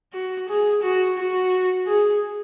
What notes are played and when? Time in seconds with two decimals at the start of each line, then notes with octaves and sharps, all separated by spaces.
0.13 F#4
0.49 G#4
0.83 F#4
1.18 F#4
1.87 G#4